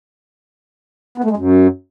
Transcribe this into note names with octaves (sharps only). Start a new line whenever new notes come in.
B3
A3
G#3
F#2